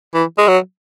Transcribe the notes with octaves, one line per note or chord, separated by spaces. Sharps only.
E3
G#3
F#3